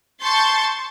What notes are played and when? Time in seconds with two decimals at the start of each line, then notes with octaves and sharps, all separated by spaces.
0.22 A5 C6 C#6 G6 A6